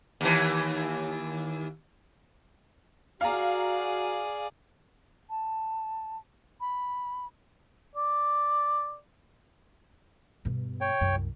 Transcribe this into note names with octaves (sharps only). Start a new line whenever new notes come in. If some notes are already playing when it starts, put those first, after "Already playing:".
D#2 E3
F#4 G#4 D5 F5 A#5
A5
B5
D5
G2 B2
C#5 G5
C2 F#2